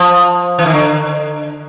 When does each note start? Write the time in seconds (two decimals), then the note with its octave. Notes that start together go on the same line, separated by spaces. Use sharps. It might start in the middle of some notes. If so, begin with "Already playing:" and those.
Already playing: F3
0.59 E3
0.66 D#3
0.73 D3